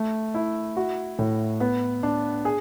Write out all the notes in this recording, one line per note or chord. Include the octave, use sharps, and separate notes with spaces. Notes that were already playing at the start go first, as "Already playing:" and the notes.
Already playing: A3
E4
F#4
A2
B3
D4
G#4